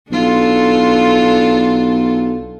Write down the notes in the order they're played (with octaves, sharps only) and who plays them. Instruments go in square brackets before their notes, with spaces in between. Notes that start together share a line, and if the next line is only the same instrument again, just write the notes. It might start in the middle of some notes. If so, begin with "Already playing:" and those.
[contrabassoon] B1 [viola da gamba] D4 F4 A4